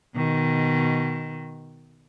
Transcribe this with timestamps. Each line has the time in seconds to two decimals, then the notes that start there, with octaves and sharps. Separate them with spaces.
0.16 B2 D#3